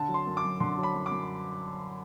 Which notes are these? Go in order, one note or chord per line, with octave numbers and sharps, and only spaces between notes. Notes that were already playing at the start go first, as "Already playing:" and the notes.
Already playing: D3 A5
F#3
C6
F#2
D6
F#2
D3 C6
F#3
B5
F#2
D6
F#2